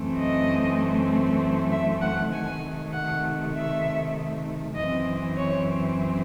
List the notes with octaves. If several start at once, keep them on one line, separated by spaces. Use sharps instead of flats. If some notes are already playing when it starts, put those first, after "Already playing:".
Already playing: F#2 E3 A3 C4
D#5
E5
F#5
C3 D#3 A3 G#5
F#5
E5
F#2 E3 C4 D#5
C#5